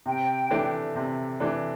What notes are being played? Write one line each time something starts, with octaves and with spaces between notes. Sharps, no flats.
C3 G5
E3 A3 D4
C3
E3 A3 D4